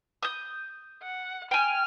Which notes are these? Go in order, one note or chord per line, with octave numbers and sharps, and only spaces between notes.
D#6 G6
F#5
G5 G#5 F6